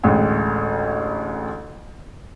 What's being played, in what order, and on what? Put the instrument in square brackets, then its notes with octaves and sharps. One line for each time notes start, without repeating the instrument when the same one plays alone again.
[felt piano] A1 D2 G#3 G5